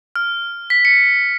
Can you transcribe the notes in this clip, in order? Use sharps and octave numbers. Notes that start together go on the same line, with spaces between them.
F6
B6
C#7